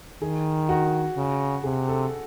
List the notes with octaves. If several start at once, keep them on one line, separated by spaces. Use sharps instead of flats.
D#3 G#4
F#4
C#3
C3 G#4
A4